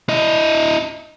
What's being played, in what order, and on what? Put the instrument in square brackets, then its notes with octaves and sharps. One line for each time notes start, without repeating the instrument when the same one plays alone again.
[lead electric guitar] E4 D#5